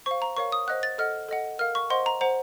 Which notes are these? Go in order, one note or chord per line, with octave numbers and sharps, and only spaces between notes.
C5 F5 C#6
A#5
A#4 C#5 F5 C#6
D#6
C5 D#5 F#5 F#6
A6
A4 D#5 F#5 F6
A4 D#5 F#5
A#4 F5 F6
C#6
C5 D#5 F#5 C6
A#5
C5 F#5 A#5